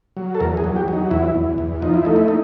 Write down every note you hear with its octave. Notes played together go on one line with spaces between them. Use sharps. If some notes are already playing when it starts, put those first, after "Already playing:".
F#3
A4
E2 A#4
G#4
F#3
G4
F#3 D#4
E2 E4
E2
E2
F3 D#4
E4
A3 D#4
E4
D#4